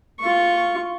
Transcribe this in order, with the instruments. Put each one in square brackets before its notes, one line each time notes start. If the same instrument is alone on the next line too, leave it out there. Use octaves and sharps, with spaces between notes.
[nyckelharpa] F4 C#6